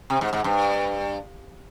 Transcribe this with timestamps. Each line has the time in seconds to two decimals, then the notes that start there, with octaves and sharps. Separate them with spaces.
0.10 C3
0.21 G#2
0.33 G#2
0.44 G2